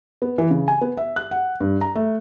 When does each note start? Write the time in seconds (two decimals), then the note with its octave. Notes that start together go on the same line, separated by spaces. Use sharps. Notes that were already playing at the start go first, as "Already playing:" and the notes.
0.22 B3
0.38 E3
0.51 C#3
0.68 G#5
0.81 B3
0.97 E5
1.16 F#6
1.31 F#5
1.60 G2
1.81 A#5
1.95 A3